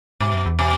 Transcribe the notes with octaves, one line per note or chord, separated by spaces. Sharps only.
G#2 B2
F#2
E2
B2